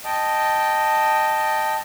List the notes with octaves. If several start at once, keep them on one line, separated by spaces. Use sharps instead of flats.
D#5 G5 A5